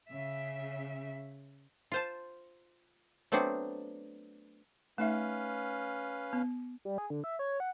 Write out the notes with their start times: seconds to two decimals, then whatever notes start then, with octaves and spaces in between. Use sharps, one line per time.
0.11 C#3 E5
1.92 F4 C5 A5
3.32 F#3 A3 B3 C4 D4 F#4
4.98 A3 C#4 D#4 B4 E5 F5
6.33 B3
6.85 G3
6.98 G#4
7.10 D3
7.24 E5
7.39 C#5
7.60 F#5